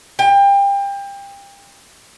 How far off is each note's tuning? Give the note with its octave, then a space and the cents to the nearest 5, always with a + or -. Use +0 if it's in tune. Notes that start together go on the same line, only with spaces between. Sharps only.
G5 +30